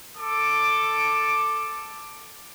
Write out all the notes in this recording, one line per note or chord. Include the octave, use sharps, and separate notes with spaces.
A4 D6